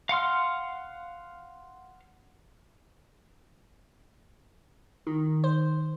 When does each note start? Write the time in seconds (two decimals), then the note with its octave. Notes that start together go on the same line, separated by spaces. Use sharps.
0.09 F5 F#5 C6 F6
5.07 D#3
5.44 C5